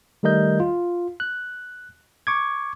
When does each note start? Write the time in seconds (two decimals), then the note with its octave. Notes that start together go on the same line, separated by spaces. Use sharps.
0.23 D#3 G3 A3 A#4 D#5 G6
0.60 F4
1.20 F#6
2.27 C#6 D6 G#6